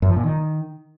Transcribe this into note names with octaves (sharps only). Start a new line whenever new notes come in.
F#2
F3
A#2
D#3